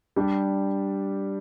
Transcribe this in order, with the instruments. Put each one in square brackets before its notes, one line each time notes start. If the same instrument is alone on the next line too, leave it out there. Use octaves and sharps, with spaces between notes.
[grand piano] G3 D4 G4